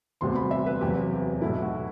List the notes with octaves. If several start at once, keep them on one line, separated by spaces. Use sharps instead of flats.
E1 D2 C3 G3 B3 C6
B5
E5
B4
E1 E2 C3 F#3 G4
B1 B2 A3 E4
F#4